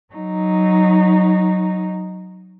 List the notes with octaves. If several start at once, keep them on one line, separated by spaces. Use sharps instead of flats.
F#3 D#4